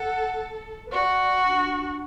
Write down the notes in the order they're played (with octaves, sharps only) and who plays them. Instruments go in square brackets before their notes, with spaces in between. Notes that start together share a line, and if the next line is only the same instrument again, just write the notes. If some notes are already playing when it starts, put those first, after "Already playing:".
Already playing: [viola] A4 [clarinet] F#5
[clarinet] B4
[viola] F#4 [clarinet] D5
[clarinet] D4